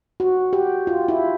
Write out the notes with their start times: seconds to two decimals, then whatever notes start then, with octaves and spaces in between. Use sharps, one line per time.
0.20 F#4
0.53 G4
0.87 F4
1.08 E4